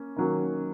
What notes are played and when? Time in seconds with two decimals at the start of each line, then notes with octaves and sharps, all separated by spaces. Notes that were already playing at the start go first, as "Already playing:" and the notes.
Already playing: A#3 C#4
0.16 D#3 F#3 A#3 C#4